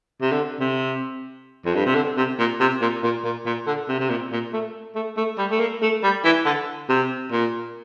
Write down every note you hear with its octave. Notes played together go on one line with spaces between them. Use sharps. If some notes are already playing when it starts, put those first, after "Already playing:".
C3
D3
C3
F2
G2
C3
D3
C3
A#2
C3
A#2
A#2
A#2
A#2
D3
C3
C3
A#2
A#2
A3
A3
A3
G3
A3
A#3
A3
G3
E3
D3
C3
A#2